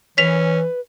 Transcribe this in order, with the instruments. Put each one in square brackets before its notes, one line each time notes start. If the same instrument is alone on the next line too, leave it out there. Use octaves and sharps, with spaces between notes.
[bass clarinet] E3 [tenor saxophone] C#4 [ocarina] B4 [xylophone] B6 F7